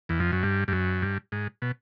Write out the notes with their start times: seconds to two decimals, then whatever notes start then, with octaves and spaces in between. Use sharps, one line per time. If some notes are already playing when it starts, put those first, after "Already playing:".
0.09 E2
0.20 F2
0.32 F#2
0.43 G2
0.68 G2
0.72 F#2
1.02 G2
1.32 G#2
1.62 B2